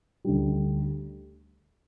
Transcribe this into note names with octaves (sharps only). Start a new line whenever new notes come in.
D2 D3 G3